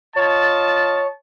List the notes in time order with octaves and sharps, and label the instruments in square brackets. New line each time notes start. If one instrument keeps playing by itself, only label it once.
[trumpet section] F4 D#5 A5 [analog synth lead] C#5